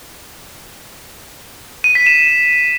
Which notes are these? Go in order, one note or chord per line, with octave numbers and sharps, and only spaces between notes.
D#7
B6
E7